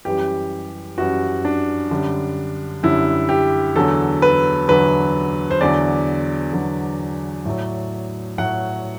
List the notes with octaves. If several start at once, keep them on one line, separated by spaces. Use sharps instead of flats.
F#2 E3 G3 G4
F#2 E3 G3 F#4
D4
F#2 D3 G3
F#2 D3 G3 E4
G4
E2 D3 F#3 A4
B4
E2 D3 F#3 B4
C5
E2 D3 F#3 D5
E2 D3 F#3
A2 F#3
A2 F#3 F#5